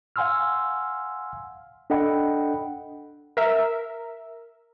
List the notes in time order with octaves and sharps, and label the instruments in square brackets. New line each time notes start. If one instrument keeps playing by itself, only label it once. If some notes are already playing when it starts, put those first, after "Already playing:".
[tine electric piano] F5 F#5 G#5 C6 E6 F6
D4 A4 D#5 F#5 G5 B5
[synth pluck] A#4 E5